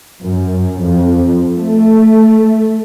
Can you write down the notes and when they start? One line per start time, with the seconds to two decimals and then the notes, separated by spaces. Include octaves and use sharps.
0.24 F#2
0.81 F2
1.54 A3